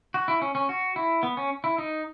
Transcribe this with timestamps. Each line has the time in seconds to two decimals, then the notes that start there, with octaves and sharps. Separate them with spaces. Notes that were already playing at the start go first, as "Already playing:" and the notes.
0.14 F#4
0.28 E4
0.42 C#4
0.55 C#4
0.69 F#4
0.96 E4
1.23 B3
1.37 C#4
1.64 E4
1.78 D#4